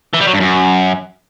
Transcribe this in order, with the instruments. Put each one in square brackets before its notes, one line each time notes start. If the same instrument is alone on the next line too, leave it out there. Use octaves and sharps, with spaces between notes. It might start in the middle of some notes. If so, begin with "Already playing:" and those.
[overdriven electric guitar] E3
G3
F#3
G2
F#2